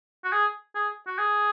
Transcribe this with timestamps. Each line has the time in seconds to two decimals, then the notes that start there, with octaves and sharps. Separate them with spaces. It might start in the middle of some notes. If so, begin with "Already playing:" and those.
0.24 F#4
0.33 G#4
0.75 G#4
1.07 F#4
1.18 G#4